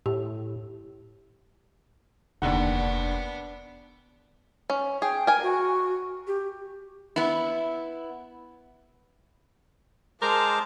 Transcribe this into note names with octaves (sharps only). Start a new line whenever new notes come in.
A2 G4
F1 D#2 D3 D#3 B3 D4 F#5
C#4
G#4 G5
A#4 G#5
F#4
G4
B3 E4
G#3 A#4 C5 A5 D6